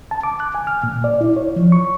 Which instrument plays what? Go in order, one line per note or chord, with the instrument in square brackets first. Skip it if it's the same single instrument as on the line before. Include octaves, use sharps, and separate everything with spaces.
[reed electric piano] A5
D6
F#6
G#5
F6
A#2
D5
E4
C#5
F3
C#6